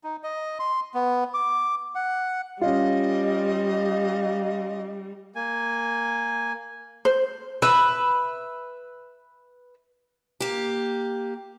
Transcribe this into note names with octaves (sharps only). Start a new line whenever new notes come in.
D#4
D#5
C6
B3
D6
F#5
G3 C#4 F4 D#5
A#3 G#5
C5
B4 E5
A#3 G4